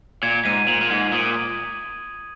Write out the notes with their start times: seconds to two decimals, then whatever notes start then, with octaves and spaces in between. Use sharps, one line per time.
0.23 A#2 G#6
0.45 G#2 D#7
0.68 A#2 F#7
0.81 A#2
0.90 G#2 G#6
1.12 A#2 D#6